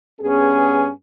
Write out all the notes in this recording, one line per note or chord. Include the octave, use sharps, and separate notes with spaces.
G2 B3 C#4 G#4